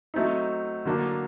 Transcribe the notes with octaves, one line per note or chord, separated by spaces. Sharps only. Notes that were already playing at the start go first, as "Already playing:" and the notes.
F#3 A3 C4 D#4
D3 F#3 A#3 D4